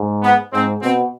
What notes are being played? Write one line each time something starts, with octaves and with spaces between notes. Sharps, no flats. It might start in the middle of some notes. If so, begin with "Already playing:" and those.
Already playing: G#2
B3
G#2 C4
B2 C4